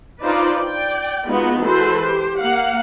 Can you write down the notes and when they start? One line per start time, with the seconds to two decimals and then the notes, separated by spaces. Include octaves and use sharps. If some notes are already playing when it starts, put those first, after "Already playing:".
0.23 D4 D#4 F4 B4 C5 D5
0.62 D5 G5
1.28 G#3 A#3 B3 D#4 F4 F#4
1.61 E3 G#3 F#4 A4 B4 C5
1.99 G4 C5
2.40 A#3 F5 F#5